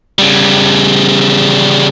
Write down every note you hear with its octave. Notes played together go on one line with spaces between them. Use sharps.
C#3 G3